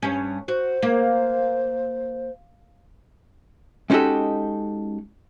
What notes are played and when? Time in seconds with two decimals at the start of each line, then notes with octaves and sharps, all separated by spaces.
0.02 G2 C#4
0.48 F#4 C5
0.83 A#3
3.90 G#3 C#4 D#4 F#4 G4 A4